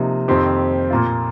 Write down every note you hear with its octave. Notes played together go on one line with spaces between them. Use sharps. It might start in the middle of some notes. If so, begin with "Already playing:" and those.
Already playing: C3 F3 A#3 D#4
F2 D#3 C4 G4
A#2 A#3 F4